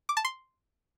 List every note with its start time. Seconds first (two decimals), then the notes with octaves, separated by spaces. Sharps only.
0.09 D6
0.17 A5
0.25 C6